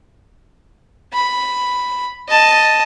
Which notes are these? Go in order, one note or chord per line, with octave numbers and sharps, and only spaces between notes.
B5
D#5 A5